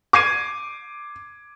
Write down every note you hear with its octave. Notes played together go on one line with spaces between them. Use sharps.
D6 G#6 C7 D#7